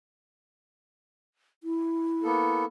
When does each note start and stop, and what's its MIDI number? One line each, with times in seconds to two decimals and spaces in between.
1.63 2.65 64
2.23 2.65 58
2.23 2.65 59
2.23 2.65 69